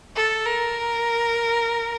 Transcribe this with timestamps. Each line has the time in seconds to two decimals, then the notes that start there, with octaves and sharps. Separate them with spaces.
0.16 A4
0.45 A#4